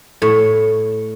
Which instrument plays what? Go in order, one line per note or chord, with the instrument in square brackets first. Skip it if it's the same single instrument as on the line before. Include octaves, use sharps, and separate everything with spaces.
[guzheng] A2 C#5